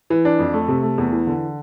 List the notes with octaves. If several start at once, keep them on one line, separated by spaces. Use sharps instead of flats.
E3
D4
F2
A3
C3
A3
E2
E3
D3